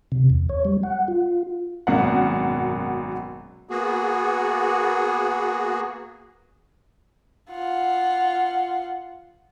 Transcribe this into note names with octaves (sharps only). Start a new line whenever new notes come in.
C3
E2
C#5
G3
F#5
F4
G#1 F#2 B2 A#3 F#5
A#3 B3 F#4 G#4
F4 F#5